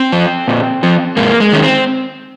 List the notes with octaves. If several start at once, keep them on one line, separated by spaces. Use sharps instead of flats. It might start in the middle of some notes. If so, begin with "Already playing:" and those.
Already playing: C4
F3
A#2
F3
G#2 A#3
G#3
D#3 C#4
C4